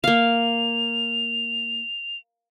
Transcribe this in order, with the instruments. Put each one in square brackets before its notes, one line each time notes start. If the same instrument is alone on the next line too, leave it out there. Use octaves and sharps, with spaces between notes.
[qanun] A#3 F5 [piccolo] F7